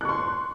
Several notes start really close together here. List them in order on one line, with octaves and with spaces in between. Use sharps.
F#6 C#6 C6